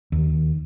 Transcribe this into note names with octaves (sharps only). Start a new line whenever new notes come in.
D#2